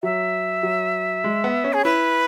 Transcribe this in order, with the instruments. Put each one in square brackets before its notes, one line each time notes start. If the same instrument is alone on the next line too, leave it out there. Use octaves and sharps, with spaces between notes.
[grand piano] F#3 [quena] E5
[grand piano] F#3
G#3
B3
C#4
[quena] G#4
[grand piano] E4 [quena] B4